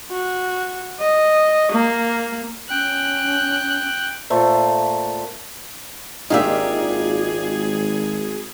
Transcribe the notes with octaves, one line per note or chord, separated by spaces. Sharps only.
F#4
D#5
A#3
C#4 G5 F#6
A#2 A3 C5
G#1 A#3 D4 D#4 F4 G4 G#4 E5